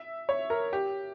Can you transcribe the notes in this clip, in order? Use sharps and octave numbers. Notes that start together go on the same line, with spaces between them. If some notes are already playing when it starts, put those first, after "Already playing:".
Already playing: E5
C#5
A#4
G4